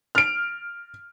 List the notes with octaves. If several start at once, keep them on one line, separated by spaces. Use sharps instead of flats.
F6 D7